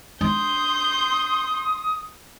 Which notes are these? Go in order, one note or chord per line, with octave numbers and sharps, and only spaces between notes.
D4 C6 D#6 G6